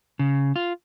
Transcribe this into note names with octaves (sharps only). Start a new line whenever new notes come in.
C#3
F4